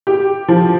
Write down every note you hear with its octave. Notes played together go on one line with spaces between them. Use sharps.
G4
F3